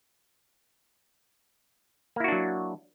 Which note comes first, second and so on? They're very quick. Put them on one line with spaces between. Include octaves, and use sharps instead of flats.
A#3 E4 F#4 D4 F#3